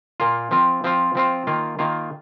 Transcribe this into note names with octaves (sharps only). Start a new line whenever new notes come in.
A#2 A#3 F4
F3 C4 F4
F3 C4 F4
F3 C4 F4
D#3 A#3 F4
D#3 A#3 F4